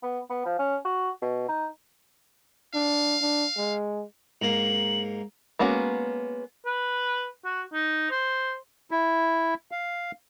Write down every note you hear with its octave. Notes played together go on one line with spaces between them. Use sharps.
B3
B3
F3
C#4
F#4
B2
D#4
D4 F5
D4
G#3
G#2 A#3 F#7
G#3 A#3 B3 C#4 F#4
B4
F#4
D#4
C5
E4
F5